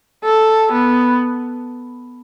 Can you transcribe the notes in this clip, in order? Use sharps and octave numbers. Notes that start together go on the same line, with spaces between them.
A4
B3